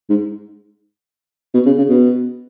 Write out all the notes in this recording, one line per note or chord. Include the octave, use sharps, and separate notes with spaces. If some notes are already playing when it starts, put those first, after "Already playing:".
G#2
B2
C#3
C#3
B2